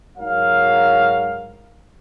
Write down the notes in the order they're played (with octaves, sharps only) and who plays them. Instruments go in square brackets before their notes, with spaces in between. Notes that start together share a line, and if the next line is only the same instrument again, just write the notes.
[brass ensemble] G#2 F#3 A#4 F5